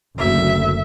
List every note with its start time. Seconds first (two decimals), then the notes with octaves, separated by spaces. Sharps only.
0.18 F#1 D2 E5